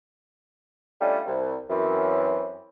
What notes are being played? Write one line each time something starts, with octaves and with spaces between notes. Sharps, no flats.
G3 A3 C#4 D4 F4 D#5
C2
F#2 E3 C4